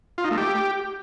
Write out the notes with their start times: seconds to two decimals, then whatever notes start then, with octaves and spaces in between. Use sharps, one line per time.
0.18 F4
0.24 D#4
0.31 A3
0.37 G4